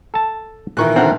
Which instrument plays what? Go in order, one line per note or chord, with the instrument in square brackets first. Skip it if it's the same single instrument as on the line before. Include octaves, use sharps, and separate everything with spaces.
[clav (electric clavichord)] A4 A5
[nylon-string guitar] A#2 D#3 E3 [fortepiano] C#6 F#6
[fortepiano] B1 D3 A#4 [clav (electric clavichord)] C4 F#5